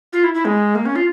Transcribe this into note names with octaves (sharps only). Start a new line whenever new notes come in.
F4
E4
E4
G#3
A#3
C#4
F4